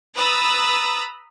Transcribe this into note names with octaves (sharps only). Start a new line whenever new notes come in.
B4 A#5 B5 D#6 E6 A6